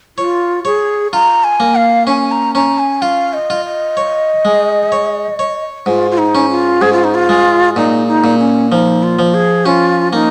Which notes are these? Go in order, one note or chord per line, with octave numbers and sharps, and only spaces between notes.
F4 C#5
G#4 C#5
F4 A#5
G#5
A#3
F5
C#4 G#5
A#5
C#4 A#5
G#5
F4 F5
D#5
F4
D#5
C#5
G#3
C#5
C#5
G#2 F4
F4
D#4
C#4
F4
G#2 G#4
F4
D#4
F4
G#3
A#2 D#4
D#4
A#2
C#4
F3 D#4
F4
F3
G#4
C#4 F4
A#3 D#4